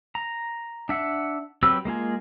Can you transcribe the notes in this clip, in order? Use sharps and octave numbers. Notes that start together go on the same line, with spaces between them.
A#5
D4 E5 F#5
F#3 C4 G4 B4 E6
G#3 A#3 F4 G#4